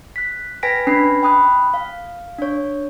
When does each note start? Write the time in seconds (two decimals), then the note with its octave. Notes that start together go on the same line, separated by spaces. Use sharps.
0.16 F#6 B6
0.63 B4 G5 G#5 A#6 B6 D7
0.87 C#4 D4 B4 G#5 B5 C7
1.23 G5 B5 D#6 F#6
1.74 F5
2.39 D4 C#5